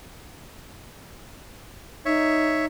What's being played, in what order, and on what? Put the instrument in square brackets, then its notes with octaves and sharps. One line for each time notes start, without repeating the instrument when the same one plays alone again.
[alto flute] D#4 [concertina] C#5 E5